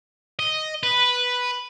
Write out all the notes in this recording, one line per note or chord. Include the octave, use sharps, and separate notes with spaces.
D#5
B4